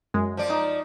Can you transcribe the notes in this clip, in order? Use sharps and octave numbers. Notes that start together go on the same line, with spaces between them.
F#2 G#3
F3 D5
D#4